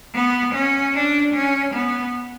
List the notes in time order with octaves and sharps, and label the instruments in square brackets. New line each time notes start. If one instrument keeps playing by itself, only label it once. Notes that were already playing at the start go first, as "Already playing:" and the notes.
[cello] B3
C#4
D4
C#4
B3